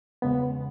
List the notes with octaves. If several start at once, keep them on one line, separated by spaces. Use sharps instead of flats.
E2 C#3 G#3 B3